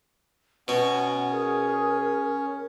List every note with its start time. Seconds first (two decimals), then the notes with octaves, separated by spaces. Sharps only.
0.68 B2 C#4 F#4 C#5 F#5
1.31 G#4 A#4